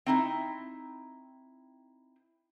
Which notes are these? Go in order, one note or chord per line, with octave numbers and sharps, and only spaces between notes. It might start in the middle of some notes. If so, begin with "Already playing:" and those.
C4 D#4 E4